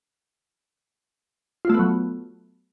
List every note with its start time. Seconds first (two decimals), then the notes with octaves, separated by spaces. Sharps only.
1.65 F4
1.70 A3
1.74 B3
1.79 F#3